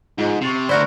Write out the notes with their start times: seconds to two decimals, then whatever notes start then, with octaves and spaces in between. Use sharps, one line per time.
0.18 G#2 F4 G#4 D#5
0.41 C3 C#6 A6 C7
0.69 D2 E4 F#4 A#4 C5 D5